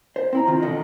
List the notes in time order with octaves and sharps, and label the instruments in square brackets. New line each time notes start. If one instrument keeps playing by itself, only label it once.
[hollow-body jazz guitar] C5
C4 E4 A#5
D#3 F4
E2 B2 D3 D#5